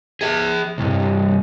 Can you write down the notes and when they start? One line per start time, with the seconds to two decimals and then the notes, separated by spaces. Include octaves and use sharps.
0.21 G#4 E5
0.78 C2 G2